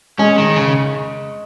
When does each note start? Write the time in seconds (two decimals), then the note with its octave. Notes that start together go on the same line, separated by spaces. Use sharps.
0.19 G#3 C#4
0.38 D#3
0.56 C#3